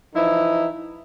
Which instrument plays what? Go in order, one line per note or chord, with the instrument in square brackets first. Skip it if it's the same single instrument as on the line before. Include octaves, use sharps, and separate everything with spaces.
[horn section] E3 F3 D#4 E4